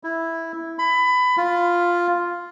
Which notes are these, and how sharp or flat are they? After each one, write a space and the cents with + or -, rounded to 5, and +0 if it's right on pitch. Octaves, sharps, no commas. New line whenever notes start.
E4 -5
B5 +20
F4 +0